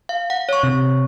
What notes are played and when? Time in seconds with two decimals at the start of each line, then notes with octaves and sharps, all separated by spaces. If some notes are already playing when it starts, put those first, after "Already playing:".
0.09 F5
0.30 F#5
0.49 C#5 C#6
0.63 C3